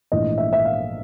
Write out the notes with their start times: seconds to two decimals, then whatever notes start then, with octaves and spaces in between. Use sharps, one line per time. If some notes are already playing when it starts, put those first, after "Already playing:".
0.12 A#1 G#2 E3 A3 D#5
0.38 E5
0.53 E5
0.65 F5